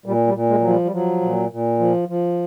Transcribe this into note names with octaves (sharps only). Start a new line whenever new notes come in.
A#2 G3
G3
A#2
G#3
F3 F#3
G3
G3
F3 F#3
A#2
A#2
F3
F3